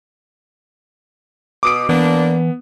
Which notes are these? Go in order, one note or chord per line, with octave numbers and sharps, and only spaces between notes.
B2 D6 D#6 D7
E3 A#3 B3 D4